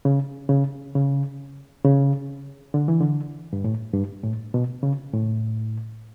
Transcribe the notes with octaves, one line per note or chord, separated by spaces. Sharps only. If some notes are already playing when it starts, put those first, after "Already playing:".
C#3
C#3
C#3
C#3
D3
E3
D3
G2
A2
G2
A2
B2
C#3
A2